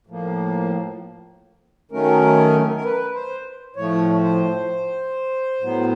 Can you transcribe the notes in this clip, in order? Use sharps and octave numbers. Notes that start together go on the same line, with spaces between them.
A2 F3 A#3
D#3 F#3 A3 C#4 A#4
A#4
B4
C5
A2 F3 A3 C#5
C5
A2 F#3 B3